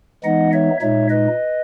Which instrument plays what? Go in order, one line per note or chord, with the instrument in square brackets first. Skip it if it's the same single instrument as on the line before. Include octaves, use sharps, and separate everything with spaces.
[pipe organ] E3 G#3 B3 D#4 D#5 F#5
C#5 E5
A#2 G#3 D#4 C#5 E5
B4 D#5